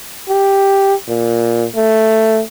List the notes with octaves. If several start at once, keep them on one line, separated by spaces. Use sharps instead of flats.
G4
A#2
A3